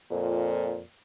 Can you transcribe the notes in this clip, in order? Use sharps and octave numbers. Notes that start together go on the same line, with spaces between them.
F2 A#2